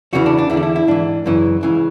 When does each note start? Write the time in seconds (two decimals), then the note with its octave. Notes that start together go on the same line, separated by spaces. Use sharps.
0.13 E2 C#3 E3 F#4
0.26 D4
0.39 D4
0.50 E2 E4
0.53 D3 D4
0.63 E4
0.76 E4
0.88 G#2 E3 D4
1.26 F#2 C#3 E3
1.63 C#2 C#3 E3